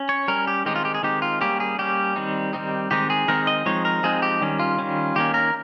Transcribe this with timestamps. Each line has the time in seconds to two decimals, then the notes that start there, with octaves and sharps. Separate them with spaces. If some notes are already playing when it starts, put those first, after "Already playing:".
Already playing: C#4
0.09 C#5
0.28 G3 C#4 A#4
0.48 G4
0.65 D#3 G#3 C4 D#4 G4
0.75 F4
0.85 G4
0.94 G#4
1.03 D#3 G#3 C4 D#4 G4
1.22 F4
1.41 G3 A#3 C#4 G4
1.60 G#4
1.79 G3 A#3 C#4 G4
2.16 D#3 G3 C4 D#4
2.53 D#3 G3 C4 D#4
2.91 D#3 G#3 C4 D#4 G4
3.10 G#4
3.28 D#3 G#3 C4 D#4 A#4
3.47 D#5
3.66 F3 G#3 C4 D#4 C#5
3.85 A#4
4.03 F3 G#3 C4 D#4 G#4
4.22 G4
4.41 D#3 G3 C#4
4.59 F4
4.79 D#3 G3 C#4
5.16 D#3 A#3 C#4 G4
5.34 A#4